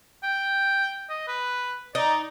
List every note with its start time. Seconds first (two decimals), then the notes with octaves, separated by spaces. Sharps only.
0.23 G5
1.09 D#5
1.28 B4
1.95 D#4 D5